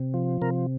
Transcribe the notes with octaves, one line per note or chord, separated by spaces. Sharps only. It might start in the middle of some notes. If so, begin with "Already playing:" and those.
Already playing: C3
F3
C3 A#4